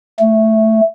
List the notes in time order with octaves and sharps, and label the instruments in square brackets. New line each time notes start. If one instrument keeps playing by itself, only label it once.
[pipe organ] A3